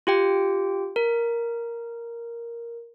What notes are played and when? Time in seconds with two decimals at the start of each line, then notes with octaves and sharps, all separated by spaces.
0.07 F4 G4 G5
0.96 A#4